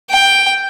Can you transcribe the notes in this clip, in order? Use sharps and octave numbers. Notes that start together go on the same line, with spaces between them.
G5